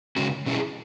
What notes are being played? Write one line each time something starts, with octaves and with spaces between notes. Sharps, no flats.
C#3 G#3 C#4 F#4
B2 A3 C#4 E4 G#4